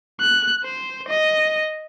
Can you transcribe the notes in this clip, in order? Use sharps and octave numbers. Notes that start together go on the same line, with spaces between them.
F#6
C5
D#5